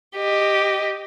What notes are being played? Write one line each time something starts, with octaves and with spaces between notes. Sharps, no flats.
G4 D#5